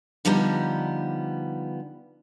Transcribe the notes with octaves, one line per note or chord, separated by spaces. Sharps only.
D3 F3 G3 B3 D#4